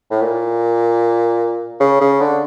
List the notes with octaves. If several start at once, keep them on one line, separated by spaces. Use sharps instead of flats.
A2
A#2
C#3
C#3
D3